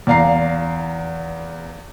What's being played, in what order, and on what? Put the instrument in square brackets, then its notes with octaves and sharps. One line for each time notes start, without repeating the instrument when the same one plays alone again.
[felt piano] E2 D5 F5 A#5 C7